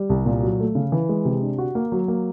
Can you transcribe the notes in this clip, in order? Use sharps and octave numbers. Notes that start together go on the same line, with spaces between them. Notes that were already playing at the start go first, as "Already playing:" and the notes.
Already playing: G3
C2
A#2
F#3
A3
C#3
E3
G#3
C3
D4
F#4
A#3
F#3
A#3